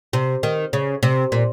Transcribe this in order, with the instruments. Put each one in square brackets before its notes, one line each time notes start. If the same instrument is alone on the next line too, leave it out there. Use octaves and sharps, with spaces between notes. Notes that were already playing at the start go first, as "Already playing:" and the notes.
[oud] C3
D#3
C#3
C3
A#2